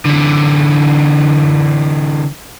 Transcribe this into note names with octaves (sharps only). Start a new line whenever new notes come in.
D3 E3